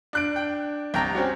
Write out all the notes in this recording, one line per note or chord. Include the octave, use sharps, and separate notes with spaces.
D4 F#6 D7
G5
C2 G5 A#5
C4 C#4 F#4